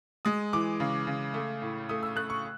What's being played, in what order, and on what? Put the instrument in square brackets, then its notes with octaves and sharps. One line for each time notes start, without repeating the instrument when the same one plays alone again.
[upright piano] G#3 D#6
E3 D6
C#3
C#3
A3
A2
A3 D#6
E6
A3 F#6
C#6